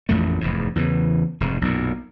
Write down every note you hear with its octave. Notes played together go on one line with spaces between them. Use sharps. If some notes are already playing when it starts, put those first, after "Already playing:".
A1 F2 A#2 A3
F1 E2 G#2
E2 C#3 E3
F1 G#2
B1 F#2 A#2